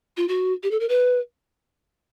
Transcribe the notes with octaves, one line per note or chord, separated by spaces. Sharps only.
F4
F#4
G4
A4
A#4
B4